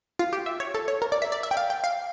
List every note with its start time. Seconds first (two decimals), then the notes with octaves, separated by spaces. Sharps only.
0.19 F4
0.33 G4
0.46 E5
0.60 C#5
0.74 A4
0.88 C#5
1.02 A#4
1.12 D5
1.22 E5
1.32 D5
1.43 E5
1.51 G5
1.57 F5
1.70 G5
1.84 F5